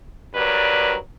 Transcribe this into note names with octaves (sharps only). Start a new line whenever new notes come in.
G2 F#3 A#4 B4 D5